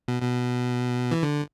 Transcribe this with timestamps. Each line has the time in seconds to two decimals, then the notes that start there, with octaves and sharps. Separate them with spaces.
0.08 B2
0.22 B2
1.11 E3
1.23 D3